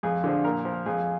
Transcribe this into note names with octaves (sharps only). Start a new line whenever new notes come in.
F2 G#4
D3 F3 G#4
A#2 A#4
F3
F2 G#4